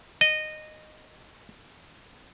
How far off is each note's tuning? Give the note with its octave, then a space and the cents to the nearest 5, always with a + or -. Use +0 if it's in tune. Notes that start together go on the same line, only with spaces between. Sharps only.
D#5 -15